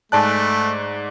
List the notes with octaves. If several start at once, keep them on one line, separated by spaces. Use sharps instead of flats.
G#2 A3 D5 G#5 A5 F#6